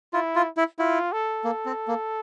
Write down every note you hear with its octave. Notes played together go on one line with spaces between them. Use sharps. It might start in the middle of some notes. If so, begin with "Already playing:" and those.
E4 F4
F4
E4
E4 F4
A4
A#3
C4
A#3